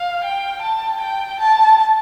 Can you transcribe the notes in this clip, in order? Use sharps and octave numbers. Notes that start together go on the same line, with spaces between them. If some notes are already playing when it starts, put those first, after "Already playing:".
Already playing: F5
G5
A5
G5
A5